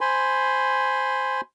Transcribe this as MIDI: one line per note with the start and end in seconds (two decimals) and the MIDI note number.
0.01 1.41 72
0.01 1.41 80
0.01 1.41 83
0.01 1.41 84